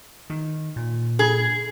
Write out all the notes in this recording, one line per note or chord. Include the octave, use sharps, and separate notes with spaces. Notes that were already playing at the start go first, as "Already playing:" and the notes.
D#3
A#2
G#4